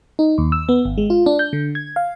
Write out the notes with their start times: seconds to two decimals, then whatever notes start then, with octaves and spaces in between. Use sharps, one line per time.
0.19 D#4
0.38 D#2
0.52 E6
0.69 B3
0.85 G#1
0.98 G#3
1.10 F4
1.26 D4
1.39 G6
1.53 D3
1.75 G#6
1.96 F5